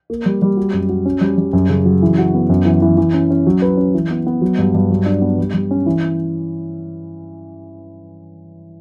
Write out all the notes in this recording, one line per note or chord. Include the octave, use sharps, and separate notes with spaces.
A#3
G3
G3
F#4
F#2
F#4
C#4
G3
G3
F#2
C#3
F#3
E3
F#4
B3
F#2
E3
E3
E3
C#4
C#4
F#3
B4
C#4
E3
B3
B3
F#3
G2
G2
F#3
D4
B3
G3
G3
C#4
E3